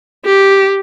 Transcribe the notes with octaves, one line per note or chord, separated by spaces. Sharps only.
G4